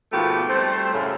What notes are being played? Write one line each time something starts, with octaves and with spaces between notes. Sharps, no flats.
G#2 B2 F3 A3 A#3 G4
G3 A3 C4 C5
F#2 A2 C#3